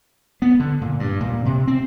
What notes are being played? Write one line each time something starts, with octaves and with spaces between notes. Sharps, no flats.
B3
D3
A#2
G2
A#2
C3
C4